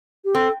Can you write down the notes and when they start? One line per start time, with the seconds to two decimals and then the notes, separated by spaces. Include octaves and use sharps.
0.25 G4
0.35 C4 A4